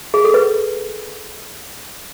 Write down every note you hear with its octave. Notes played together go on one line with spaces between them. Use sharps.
G#4
A4
B4